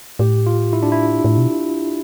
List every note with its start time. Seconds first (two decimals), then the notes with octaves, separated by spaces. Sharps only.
0.19 A2 G4
0.46 F4
0.73 E4
0.82 D4
0.92 E4
1.24 A2
1.38 B2